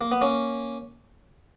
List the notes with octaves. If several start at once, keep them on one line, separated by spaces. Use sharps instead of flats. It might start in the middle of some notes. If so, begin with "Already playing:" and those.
A#3
B3
A#3 C#4